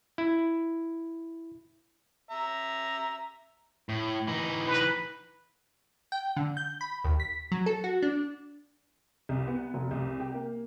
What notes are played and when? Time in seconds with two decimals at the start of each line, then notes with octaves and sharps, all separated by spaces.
0.18 E4
2.31 E5 A#5
3.89 A2
4.28 E3 D#4
4.67 B4
6.12 G5
6.36 D3
6.57 G6
6.81 B5
7.04 D#2
7.20 B6
7.52 F#3
7.66 A4
7.84 F#4
8.03 D4
9.29 C2
9.47 B3
9.74 F1
9.91 C2
10.20 G4
10.34 A#3